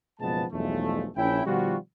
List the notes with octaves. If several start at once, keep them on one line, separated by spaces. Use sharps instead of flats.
F#1 B2 F3 G#3 B3 A5
B1 E2 G2 F3 G#3 A3
A#1 C#4 E4 G5
B2 D#3 F3 G3 F4 F#4